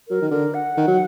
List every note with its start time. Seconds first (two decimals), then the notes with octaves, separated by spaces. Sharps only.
0.08 F#3 A#4
0.22 D#3
0.31 D3 A#4
0.54 F#5
0.77 D#3
0.87 F#3